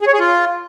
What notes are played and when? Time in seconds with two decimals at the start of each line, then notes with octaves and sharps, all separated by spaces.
0.01 G#4
0.07 C#5
0.13 G#4
0.19 F4